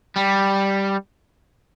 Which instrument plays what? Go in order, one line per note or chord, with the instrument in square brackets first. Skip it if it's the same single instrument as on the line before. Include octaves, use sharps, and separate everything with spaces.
[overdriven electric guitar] G3